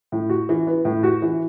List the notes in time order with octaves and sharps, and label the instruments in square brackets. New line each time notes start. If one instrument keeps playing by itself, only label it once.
[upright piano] A2
F#4
E3
B3
A2
F#4
E3